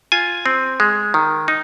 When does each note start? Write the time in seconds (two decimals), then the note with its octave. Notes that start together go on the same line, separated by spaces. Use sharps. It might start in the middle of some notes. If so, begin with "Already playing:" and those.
0.12 F4 G#5
0.46 C4
0.80 G#3
1.14 D#3
1.48 D#4